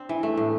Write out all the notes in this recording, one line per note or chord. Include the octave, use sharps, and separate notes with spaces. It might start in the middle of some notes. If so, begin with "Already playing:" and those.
Already playing: C4 D4
E3
A3
A2